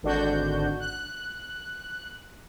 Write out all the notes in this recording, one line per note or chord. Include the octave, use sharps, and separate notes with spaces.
G#1 D3 D4 F#4 G6
F#6